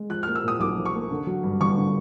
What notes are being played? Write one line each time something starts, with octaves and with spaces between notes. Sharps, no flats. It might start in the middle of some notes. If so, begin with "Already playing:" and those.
Already playing: G#3
F3 F#6
A#3 F6
E6
A#2 D#6
B1 D6
F3
C#6
A#3
D3
F#3
G2
G1 C#6
D3